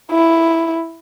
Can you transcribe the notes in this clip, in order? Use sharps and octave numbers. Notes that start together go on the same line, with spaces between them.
E4